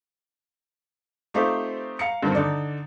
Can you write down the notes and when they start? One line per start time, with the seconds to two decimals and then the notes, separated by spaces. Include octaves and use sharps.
1.34 A3 C4 D#4 F4 G4 C5
1.99 F5 A#5 C#7
2.23 G2 D3 D#3 C4
2.35 D3 D#4 D5